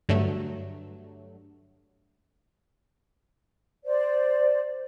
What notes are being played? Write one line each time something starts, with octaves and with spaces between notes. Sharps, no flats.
G2 D3 F#3 A3
C5 D5